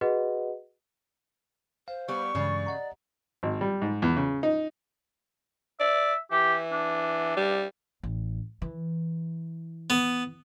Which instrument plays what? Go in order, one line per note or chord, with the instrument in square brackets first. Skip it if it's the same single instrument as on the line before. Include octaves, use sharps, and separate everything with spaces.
[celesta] F#4 G#4 B4 D#5 F#5
[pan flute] C5 [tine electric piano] F5
[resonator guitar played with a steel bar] G3 B3 [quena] C#6
[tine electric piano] G2 E3 G#3 [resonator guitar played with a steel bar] C#3 [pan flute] D5
[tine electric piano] D#5 F#5 A#5
[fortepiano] G#1
G3
G#2
E2
C#3
D#4
[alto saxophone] D5 [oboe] E5
[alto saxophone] E3 [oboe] G4
[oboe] D4
[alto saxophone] G3
[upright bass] A1
E3
[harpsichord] B3